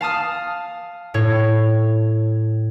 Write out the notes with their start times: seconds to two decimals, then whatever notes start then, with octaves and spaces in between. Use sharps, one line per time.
0.01 F5 A5 D#6 F6
1.14 A2 C#5